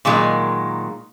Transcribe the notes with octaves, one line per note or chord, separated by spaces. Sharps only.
A#2 D#3 F#3 G#3 A#3